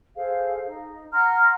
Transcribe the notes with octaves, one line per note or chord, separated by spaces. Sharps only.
G#4 A4 C5 F5
D#4
F#5 A#5 C6 F6